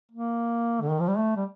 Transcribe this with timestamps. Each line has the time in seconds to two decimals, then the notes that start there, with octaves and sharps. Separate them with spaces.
0.11 A#3
0.81 D3
0.90 D#3
1.00 F3
1.08 G3
1.18 A3
1.36 G3